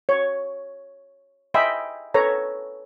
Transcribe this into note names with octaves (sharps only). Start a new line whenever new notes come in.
C#5
D#5 E5 G5 G#5 B5 C6
A4 B4 C#5 A#5